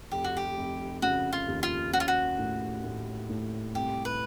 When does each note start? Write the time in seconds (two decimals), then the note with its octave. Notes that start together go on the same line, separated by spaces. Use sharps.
0.11 F1 G4
0.24 F#4
0.37 G4
0.57 F1
1.02 C#3 F#4
1.33 F4
1.48 D#2
1.63 F4
1.93 C#4 F#4
2.00 F4
2.08 F#4
2.38 A2
2.84 A2
3.29 A2
3.75 C2 G4
4.05 B4